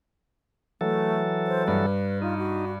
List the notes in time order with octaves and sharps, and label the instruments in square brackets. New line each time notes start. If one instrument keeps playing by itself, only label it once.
[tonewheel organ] E3 F#3 A4 [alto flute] A3
[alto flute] C5
[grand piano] G2 [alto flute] B4
[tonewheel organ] D#4 [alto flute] F4
[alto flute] F#4